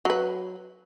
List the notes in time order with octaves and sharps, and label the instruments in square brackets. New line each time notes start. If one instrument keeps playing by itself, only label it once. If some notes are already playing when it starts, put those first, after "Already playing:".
[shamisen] F#3 B4